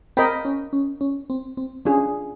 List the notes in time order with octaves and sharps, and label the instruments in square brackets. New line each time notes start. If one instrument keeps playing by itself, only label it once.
[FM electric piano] C4 [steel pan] A#4 D#5 G5 B5
[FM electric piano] C#4
C#4
C#4
C4
C4
[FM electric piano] C#4 [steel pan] D4 F4 G#4